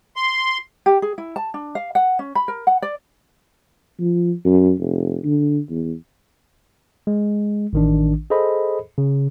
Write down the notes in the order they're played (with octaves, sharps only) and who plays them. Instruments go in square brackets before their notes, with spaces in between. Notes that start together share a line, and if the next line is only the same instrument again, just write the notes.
[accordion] C6
[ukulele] G4
G#4
E4
A5
D4
F5
F#5
C#4
B5
A#4
F#5
D5
[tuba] F3
F#2
F1
D3
E2
[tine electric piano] G#3
A1 D#3 D4
G#4 A4 C5 D#5 B5
C#3